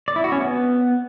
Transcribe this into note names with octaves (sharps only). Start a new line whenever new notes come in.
D5
E4
F#4
C#4
B3